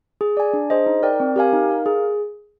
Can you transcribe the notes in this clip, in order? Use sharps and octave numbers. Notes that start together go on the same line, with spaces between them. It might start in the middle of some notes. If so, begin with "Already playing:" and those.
G#4
D5 G#5
D4
G#4 C5 D#5
D#4
A#4 D5 G5
C4
G4 A#4 F5 G#5
D#4
A#4 F5
G#4